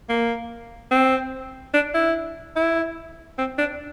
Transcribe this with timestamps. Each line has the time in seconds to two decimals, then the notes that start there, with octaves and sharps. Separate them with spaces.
0.09 A#3
0.91 C4
1.74 D4
1.94 E4
2.56 E4
3.38 C4
3.58 D4